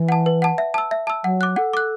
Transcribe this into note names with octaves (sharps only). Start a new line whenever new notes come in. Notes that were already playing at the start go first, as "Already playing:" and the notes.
Already playing: E3
F#5 A5
B4
F#5 A5
E5
A5 E6
E5
A5 E6
F#3 F#5
D6 F#6
A4 F#5
D6 F#6